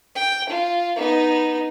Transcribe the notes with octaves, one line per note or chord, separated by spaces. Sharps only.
G5
F4
B3 D#4